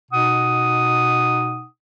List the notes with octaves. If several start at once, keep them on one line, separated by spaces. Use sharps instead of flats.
B2 D#4 F#5 D#6